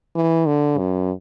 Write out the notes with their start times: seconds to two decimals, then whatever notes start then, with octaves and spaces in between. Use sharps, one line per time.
0.15 E3
0.47 D3
0.78 F#2